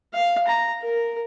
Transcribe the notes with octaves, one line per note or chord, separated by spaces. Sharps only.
F5
A#5
A#4